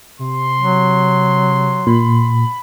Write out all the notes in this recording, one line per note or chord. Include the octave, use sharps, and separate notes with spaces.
C3 C6
F#3
A#2 B5